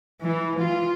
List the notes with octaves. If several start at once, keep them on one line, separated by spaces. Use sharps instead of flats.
E3
F4